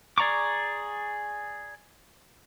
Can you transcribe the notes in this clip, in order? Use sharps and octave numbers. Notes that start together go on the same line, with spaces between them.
G#4 D5 A#5 C#6 D6